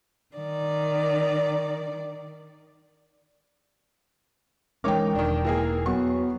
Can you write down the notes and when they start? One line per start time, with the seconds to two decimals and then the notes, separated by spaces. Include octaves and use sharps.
0.36 D#3 D5
4.84 E3 G#3 C#4 D#4 A#4 C#5 G5 D6
5.15 E1 D#3 D4
5.45 E3 A#3 G#4
5.86 F#3 B3 C#6